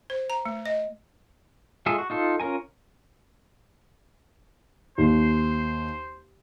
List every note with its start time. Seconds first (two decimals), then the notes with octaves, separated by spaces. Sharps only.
0.10 C5
0.30 A#5
0.45 A3
0.66 D#5
1.86 G#3 F4 G#4 A4 E5
1.98 F#4
2.10 D#4 F4 A4
2.40 C#4 F4 A#4 G#5
4.98 D#2 C5